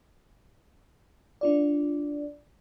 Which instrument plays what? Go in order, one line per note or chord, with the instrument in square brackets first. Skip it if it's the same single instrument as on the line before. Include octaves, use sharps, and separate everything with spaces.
[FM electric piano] D4 F4 D5